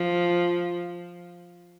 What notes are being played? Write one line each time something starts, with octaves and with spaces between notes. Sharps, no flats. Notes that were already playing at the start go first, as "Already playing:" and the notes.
Already playing: F3